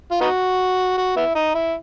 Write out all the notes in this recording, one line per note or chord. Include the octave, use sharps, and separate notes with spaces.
F4
B3 D#4 F#4
F#4
B3 E4
D#4
E4